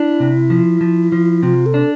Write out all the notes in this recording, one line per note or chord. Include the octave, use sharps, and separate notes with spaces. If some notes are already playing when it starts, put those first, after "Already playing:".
Already playing: D4 E4
C3
F3
F3
F3
C3 F4
A4
D4